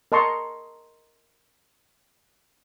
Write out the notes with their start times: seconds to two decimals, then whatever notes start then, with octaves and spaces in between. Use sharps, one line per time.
0.12 A#4 D#5 A5 A#5 C6 C#6